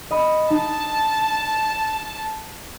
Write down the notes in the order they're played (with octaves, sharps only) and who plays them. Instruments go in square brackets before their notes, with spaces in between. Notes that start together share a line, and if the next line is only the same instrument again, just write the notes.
[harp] D#5 B5
[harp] D#4 [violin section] A5